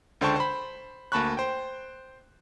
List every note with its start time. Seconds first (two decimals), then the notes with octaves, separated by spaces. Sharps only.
0.21 C#2 D3 C5 G5 A5 C#6
0.36 C5 B5
1.12 D2 A#3 A5 B5 C#6 F#6
1.37 C5 G5